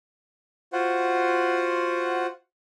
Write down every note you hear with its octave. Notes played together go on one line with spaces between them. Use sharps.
F4 F#4 C5 F#5